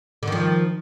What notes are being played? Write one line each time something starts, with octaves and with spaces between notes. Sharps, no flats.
D3 D#3 F3